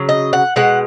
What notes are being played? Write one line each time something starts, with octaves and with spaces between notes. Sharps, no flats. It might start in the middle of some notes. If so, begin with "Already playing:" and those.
Already playing: C#3 F#3
D#5
F#5
B2 G#3 F#5